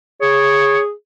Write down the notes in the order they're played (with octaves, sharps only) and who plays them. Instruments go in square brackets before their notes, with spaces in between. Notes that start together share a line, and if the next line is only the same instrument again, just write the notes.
[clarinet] G#4 [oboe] C#5